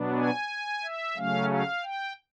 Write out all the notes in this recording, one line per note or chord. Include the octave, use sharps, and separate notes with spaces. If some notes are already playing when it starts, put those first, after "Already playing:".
Already playing: B2 F#3 B3 D4
G#5
E5
C#3 F#3 A3 C#4 F5
F5
G5